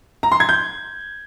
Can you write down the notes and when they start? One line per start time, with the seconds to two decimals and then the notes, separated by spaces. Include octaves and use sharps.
0.23 A#5
0.32 C6
0.40 G#6
0.49 G6